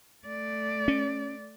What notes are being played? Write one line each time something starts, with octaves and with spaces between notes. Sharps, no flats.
A3 D5
C#4